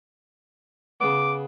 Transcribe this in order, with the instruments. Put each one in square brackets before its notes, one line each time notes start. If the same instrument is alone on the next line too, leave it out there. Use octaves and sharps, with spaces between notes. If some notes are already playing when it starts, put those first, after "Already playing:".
[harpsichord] C#3 B3 [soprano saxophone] D6